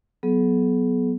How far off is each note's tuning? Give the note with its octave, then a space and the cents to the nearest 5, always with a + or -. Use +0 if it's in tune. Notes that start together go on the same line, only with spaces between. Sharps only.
F#3 +0 B3 +0 G#4 +45